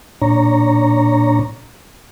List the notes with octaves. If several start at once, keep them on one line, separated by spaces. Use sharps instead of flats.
A#2 D4 C#5 A#5